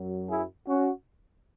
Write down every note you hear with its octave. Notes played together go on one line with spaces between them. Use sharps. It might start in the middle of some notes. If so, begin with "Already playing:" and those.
Already playing: F#2 F#3
E4 G#4
C#4 F#4